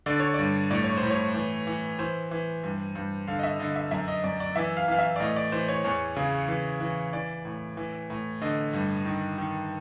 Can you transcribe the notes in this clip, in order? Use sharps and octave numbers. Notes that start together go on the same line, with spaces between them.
D3 D5
C#5
G2 D5
A2 D5
C#5
C5
A2
C#5
E3
E3
E3 C5
E3
G2
G2
D3 F5
D#5
E5
D3 D#5
E5
F#2 E5
D#5
F#2 D5
D5
E3 E5
F5
E3 F5
E5
D5
A2 D#5
D5
E3 C5
C#5
E2 C#5
C#3
E3
E3
E3 D5
A2
E3
A2
D3 D#5
G2
D#3
D#3